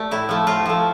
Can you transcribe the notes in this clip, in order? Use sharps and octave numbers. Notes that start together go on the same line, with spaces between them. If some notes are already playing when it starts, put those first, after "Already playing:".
Already playing: A3 G4 D5
A2 E4
F3 A3
A2 F4
F3 A3